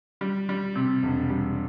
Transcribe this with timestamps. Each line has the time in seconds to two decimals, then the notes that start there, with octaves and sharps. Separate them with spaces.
0.21 G3
0.49 G3
0.75 C3
1.03 E1
1.30 G3